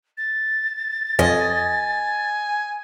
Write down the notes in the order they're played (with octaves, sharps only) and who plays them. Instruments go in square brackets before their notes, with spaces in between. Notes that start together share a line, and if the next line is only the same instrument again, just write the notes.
[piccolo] A6
[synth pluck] F2 [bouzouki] D#5 [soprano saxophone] G#5